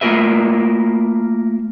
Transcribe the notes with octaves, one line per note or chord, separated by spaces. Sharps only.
A3 A#3 F4 A#4 B4 E5